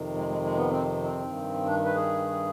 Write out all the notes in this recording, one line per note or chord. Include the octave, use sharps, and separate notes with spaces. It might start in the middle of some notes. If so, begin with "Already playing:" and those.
Already playing: F2 C3 D#3
G#3
G#3
G#3
B3
C4
C4
G2 D#3
D4
B4
G#4